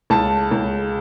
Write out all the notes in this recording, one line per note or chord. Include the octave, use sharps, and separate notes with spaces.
C#2 A5
C#2